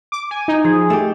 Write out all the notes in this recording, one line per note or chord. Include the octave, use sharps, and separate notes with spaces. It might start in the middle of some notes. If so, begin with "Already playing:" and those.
D6
G#5
D#4
F3 G#4
A3 G4